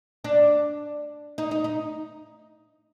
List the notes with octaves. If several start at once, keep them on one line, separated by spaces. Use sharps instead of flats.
D4
D#4
D#4
D#4